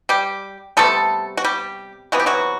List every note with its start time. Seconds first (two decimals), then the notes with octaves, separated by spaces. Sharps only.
0.09 G3 G4
0.77 C3 G3 A3 B3 A4
1.37 F#4
1.44 G3 G4
2.12 C3 E3 B3 F#4
2.20 G4
2.26 F#3 F#4